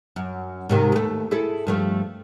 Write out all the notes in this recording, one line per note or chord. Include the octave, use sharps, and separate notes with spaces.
F#2
G#2 C3 D#3
D#2 A3
E4 G#4 A4
G2 F3 A3